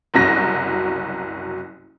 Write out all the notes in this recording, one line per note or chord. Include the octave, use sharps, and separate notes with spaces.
F#1 C2 F#3 A#6